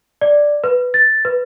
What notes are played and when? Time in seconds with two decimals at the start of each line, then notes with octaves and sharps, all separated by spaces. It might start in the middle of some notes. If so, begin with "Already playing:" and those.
0.21 D5
0.64 B4
0.94 A6
1.25 B4